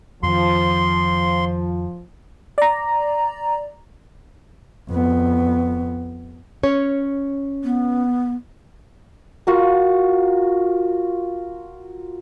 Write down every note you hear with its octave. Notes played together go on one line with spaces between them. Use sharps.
F2 D#3 F3 C6
D5 A#5
F2 B3
C#4 C#5
B3
F4 F#4 A#4